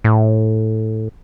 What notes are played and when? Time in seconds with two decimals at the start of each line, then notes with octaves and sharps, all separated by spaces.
0.04 A2